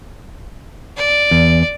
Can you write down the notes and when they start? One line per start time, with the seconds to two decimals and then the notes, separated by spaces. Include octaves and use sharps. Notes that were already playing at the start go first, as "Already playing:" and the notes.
0.97 D5
1.31 E2